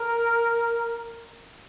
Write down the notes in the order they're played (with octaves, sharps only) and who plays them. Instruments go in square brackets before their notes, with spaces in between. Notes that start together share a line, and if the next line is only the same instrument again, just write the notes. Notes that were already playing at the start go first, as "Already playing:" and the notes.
Already playing: [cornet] A#4